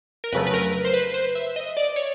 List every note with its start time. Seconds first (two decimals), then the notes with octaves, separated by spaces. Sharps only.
0.24 A#4
0.32 F2 C#3 F#3 A3 B4
0.47 B4
0.54 A#4
0.85 C5
0.94 B4
1.14 C5
1.35 E5
1.56 D#5
1.77 D5
1.96 C#5